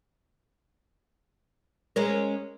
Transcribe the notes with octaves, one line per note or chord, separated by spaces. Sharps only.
G#3 C#4 A#4